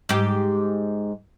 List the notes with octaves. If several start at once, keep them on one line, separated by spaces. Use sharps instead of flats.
G#2 G4